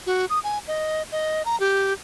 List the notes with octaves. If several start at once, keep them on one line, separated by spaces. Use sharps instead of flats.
F#4
D#6
G#5
D#5
D#5
A#5
G4